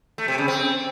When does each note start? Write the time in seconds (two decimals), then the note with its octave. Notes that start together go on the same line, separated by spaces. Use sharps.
0.18 A3
0.28 C3
0.38 C#3
0.48 C4